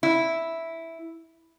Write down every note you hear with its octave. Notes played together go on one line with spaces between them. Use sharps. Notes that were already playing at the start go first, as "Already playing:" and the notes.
E4